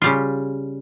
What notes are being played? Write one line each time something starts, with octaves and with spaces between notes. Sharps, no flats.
C#3 G3 F4